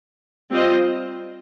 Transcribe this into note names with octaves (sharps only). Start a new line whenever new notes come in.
G3 C4 F4 C5 D#5